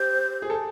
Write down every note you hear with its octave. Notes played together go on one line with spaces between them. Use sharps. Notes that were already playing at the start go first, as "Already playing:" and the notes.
Already playing: G4 C5
G#4
A4